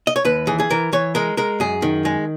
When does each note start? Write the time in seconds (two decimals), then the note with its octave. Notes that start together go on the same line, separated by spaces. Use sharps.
0.07 D#5
0.16 C#5
0.25 D#2 B4
0.47 E3 G#4
0.59 G#4
0.70 E3 A#4
0.92 E3 C#5
1.15 G#3 A#4
1.37 G#3 A#4
1.60 F#2 G#4
1.82 D#3
2.05 G#3